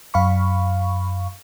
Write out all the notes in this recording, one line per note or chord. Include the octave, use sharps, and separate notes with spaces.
F#2 F5 B5 C#6